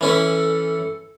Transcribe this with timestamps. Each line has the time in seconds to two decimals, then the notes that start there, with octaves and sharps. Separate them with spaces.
0.01 E3 C#4 E4 A4